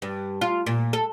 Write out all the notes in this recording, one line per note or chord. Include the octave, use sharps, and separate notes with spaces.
G2
F4
A#2
A4